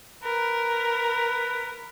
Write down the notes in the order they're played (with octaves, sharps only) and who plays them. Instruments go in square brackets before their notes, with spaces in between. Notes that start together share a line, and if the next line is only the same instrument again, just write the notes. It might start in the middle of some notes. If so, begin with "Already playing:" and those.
[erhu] A#4 [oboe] B4